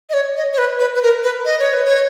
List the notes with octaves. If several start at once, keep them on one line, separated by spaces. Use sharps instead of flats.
D#5
C#5
D#5
C#5
B4
B4
B4
A#4
B4
D#5
C#5
B4
C#5